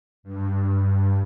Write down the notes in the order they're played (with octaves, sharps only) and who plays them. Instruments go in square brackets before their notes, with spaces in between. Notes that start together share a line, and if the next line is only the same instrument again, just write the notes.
[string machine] G2